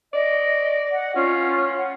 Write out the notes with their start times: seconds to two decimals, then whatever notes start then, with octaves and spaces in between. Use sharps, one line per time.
0.13 D5 D#5
0.92 F#5
1.16 C#4 F4
1.77 F#5